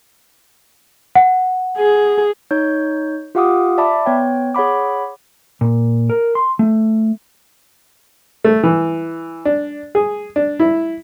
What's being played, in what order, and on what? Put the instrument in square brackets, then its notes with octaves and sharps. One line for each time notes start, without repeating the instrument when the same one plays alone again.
[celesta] F#5
[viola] G#4
[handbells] D#4 C#5 G6
F4 G4 F5 F#5 D6 D#6
D5 E5 A5 B5 D6
B3 C#5 G5
G#4 C#5 F#5 B5 D6
[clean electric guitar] A#2
A#4
C6
A3
[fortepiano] A3
E3
D4
G#4
D4
E4